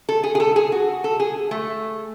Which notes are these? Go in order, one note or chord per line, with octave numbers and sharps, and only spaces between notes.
A4
G#4
G#4
A4
G#4
F#4
A4
G#4
A3